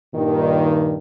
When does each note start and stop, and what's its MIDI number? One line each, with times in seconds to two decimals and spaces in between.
0.15 0.96 43
0.15 0.96 46
0.15 0.96 51